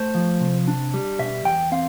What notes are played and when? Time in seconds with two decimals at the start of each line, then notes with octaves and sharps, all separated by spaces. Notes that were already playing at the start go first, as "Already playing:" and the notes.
Already playing: A3 C5
0.15 F3
0.41 C3
0.68 D4
0.94 G3
1.19 B2 E5
1.45 E2 G5
1.72 C4 F5